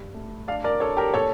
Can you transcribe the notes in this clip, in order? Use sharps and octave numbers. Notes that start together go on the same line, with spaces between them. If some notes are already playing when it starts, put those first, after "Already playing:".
Already playing: G2
A3
D4 D5 F5
A#4 D5
D4 A4 C#5
G4 A#4
A#2 A4 C#5